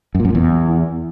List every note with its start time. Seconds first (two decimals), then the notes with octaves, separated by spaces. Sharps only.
0.15 F#2
0.20 A#2
0.25 F#2
0.30 A#2
0.35 E2